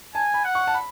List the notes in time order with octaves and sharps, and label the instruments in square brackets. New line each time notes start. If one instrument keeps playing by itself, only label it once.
[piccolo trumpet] G#5 [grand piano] A5
[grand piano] B5
[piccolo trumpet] F#5
[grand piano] C#6
A5
B5